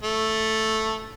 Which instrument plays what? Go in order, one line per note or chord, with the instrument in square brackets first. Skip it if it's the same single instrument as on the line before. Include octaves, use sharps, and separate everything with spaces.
[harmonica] A3